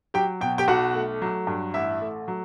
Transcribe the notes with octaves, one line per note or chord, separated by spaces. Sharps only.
F#3 G4 G5
B2 G5
G4 G5
B1 F#4 F#5
A3
F#3
G2
A1 E4 E5
A3
F#3